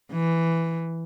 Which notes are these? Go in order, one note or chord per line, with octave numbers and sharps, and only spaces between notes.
E3